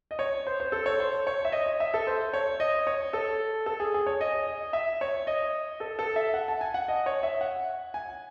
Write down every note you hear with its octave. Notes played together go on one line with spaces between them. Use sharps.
D#5
C#5
C5
C5
A4
C#5
C5
C#5
E5
D#5
D#5
E5
A4
C5
C#5
D#5
C#5
A4
A4
G#4
G#4
C#5
D#5
D#5
E5
C#5
D#5
A4
A4
E5
F#5
A5
G#5
F#5
D#5
C#5
E5
F#5
G#5